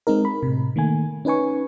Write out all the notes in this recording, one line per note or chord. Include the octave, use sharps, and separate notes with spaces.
G#3 C4 D#4 A#4
B5
A2 C3
D#3 A3 A#3 G#5
C#4 D#4 B4 G#5 C#6